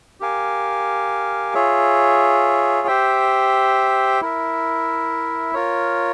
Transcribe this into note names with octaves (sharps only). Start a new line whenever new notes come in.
G4 A#4 F5 G#5
F4 G#4 C#5 E5
G4 C5 E5 G5
E4 A#4 E5
F4 A#4 C#5